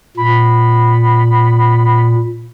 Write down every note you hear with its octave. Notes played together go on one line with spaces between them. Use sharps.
A#2 B5